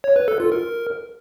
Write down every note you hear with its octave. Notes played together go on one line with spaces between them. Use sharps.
C#5
B4
A4
F4
A#4